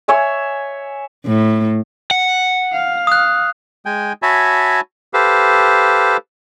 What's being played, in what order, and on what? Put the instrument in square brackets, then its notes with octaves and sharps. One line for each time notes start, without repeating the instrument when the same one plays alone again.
[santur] C#5 E5 G#5
[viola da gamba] A2
[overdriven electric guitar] F#5
[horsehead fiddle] F5
[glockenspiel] D#6 F#6
[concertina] G#3 G5 G#5
F#4 C#5 E5 G#5 A5 B5
G4 A4 B4 C5 F5